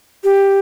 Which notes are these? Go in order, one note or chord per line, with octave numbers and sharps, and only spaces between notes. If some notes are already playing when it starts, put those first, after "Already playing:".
G4